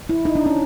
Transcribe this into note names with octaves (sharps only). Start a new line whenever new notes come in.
E4
D#4
D4
C#4